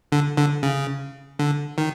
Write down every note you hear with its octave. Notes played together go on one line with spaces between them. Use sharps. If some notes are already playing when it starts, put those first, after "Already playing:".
D3
D3
C#3
D3
D#3